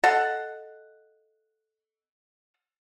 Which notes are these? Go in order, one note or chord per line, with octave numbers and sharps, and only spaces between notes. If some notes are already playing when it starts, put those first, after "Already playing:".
A4 D#5 F5 F#5